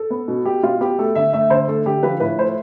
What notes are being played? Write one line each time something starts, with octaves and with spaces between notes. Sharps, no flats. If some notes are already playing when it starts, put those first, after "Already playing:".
Already playing: A4
B3
B2
B3 G4
B2 F4
B3 G4
A3 A4
D3 E5
A3 E5
D3 C5
A3 A4
D3 G4
F3 B4
A2 B4
A3 C5